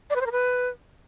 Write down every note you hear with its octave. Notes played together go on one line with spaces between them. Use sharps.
D5
B4
C5
A#4
B4